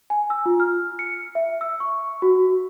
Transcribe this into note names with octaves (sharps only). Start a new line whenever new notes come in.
G#5
E6
F4
F6
C#7
E5
E6
C#6
F#4